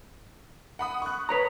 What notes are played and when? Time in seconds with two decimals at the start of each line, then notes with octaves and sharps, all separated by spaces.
0.79 F#5 B5 D#6
1.02 C#6 F#6
1.29 B4 C#5 A#5